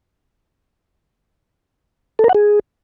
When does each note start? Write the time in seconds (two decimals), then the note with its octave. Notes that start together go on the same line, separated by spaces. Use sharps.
2.19 A4
2.24 A#4
2.29 F#5
2.35 G#4